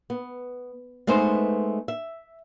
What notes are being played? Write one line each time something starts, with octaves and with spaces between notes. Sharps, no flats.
B3
G#3 A3 B3 D#4 C5
E5